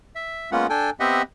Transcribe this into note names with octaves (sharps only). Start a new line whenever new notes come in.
E5
G#3 A#3 B3 C#4 F4 F#5
D4 A4 G5 G#5
B3 C4 G4 D#5 E5 F#5